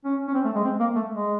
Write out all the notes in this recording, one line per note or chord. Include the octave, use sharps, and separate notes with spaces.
C#4
C#4
C4
A3
G#3
C4
A#3
A3
G#3